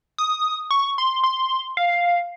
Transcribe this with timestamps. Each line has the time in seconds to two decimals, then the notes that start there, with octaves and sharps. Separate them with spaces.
0.18 D#6
0.71 C#6
0.98 C6
1.24 C6
1.77 F5